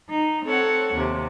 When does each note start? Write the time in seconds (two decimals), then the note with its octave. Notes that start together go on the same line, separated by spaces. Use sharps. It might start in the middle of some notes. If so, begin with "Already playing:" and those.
0.11 D#4
0.45 C4 A4 C#5 F#5
0.94 D#2 C3